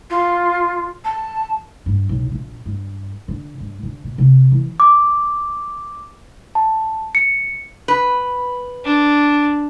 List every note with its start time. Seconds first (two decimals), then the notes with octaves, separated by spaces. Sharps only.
0.10 F4
1.05 A5
1.86 G2
2.09 B1
2.32 A#1
2.66 G2
3.28 D3
3.60 G2
3.83 D3
4.04 A#2
4.18 C3
4.52 E3
4.80 D6
6.55 A5
7.15 C#7
7.88 B4
8.85 D4